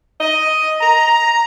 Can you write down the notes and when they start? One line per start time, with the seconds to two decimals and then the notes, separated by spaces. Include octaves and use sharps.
0.19 D#5
0.81 A#5